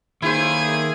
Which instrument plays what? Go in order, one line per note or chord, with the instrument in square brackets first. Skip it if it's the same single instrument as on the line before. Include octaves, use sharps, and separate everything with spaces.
[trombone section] B1 A#3 [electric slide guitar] D#3 [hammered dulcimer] E4 C5 [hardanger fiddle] G#4